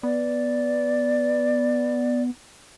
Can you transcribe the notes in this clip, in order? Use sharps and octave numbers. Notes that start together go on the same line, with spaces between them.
B3 D5